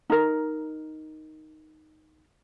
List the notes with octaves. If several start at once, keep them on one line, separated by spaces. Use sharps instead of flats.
D#4 A#4